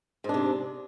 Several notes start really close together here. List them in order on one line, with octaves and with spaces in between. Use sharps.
G#2 D4 C3